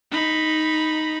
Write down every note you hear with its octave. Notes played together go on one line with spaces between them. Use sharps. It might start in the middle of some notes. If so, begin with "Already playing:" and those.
D#4 B5